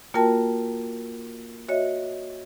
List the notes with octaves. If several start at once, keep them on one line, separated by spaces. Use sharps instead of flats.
A#3 F4 F#4 A#4 G5 A5
F#4 C#5 D#5 E5